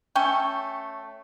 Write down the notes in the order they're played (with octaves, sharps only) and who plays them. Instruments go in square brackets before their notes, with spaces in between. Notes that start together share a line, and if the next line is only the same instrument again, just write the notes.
[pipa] A3 C#4 C#5 G5